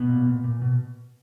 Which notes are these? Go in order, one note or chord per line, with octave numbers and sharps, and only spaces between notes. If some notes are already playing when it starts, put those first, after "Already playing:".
Already playing: B2 B3
A#2
A#2
A#2
B2